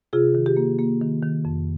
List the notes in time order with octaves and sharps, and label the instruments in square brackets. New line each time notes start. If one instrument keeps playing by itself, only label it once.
[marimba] C3 F4 G#4
D#3
G4
A#3
A#3
D#3
D#3
F2